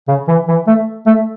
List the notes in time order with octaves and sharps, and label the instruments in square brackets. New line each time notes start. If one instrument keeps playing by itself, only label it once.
[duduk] C#3
E3
E3
A3
A3